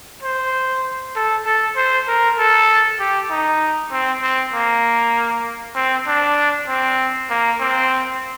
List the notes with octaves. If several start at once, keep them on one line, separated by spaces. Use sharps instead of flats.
C5
A4
A4
C5
A#4
A4
G4
D#4
C4
C4
A#3
C4
D4
C4
A#3
C4